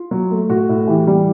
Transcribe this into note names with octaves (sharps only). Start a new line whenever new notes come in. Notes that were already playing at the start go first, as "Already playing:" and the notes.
Already playing: F4
F#3
A3
A2 F#4
A2
E3 G4
G3